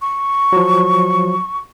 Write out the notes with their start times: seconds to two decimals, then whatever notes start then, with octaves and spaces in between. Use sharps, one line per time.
0.01 C#6
0.53 F3 F#3